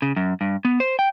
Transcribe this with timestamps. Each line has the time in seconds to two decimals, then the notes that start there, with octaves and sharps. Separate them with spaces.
0.02 C#3
0.16 F#2
0.41 G2
0.65 B3
0.80 C5
0.99 G5